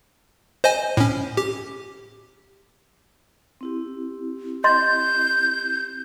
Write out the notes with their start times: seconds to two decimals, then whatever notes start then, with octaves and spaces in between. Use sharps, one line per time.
0.64 C5 D#5 G#5
0.97 A2 C#4
1.37 G4
3.61 C4 E4 G4
4.64 D#5 C6 G6 A6